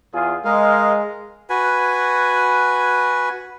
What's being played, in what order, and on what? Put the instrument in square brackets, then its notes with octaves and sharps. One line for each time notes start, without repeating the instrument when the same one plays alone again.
[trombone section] E2 F4 G#4
[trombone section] G#3 [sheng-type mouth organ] A#4 D#5 F5
[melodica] F#4 B4 G#5